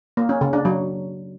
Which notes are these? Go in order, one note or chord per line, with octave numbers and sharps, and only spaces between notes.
A#3
C#4
C#3
D4
F#3